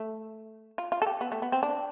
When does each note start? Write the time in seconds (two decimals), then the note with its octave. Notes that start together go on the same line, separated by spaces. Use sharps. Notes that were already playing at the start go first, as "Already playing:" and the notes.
Already playing: A3
0.78 F4
0.92 F4
1.02 A4
1.06 G4
1.21 B3
1.32 A3
1.42 B3
1.52 C4
1.63 D4